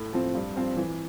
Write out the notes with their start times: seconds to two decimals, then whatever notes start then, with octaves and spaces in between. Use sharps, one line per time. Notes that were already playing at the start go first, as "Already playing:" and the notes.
Already playing: A2
0.13 F3 C4
0.35 G2
0.56 F3 C4 F4 C5
0.77 E3